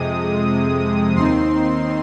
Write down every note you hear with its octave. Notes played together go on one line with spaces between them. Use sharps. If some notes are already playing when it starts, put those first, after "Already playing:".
Already playing: F2 C3 G#3 D#6
D#2 D#3 C4 D#4 C6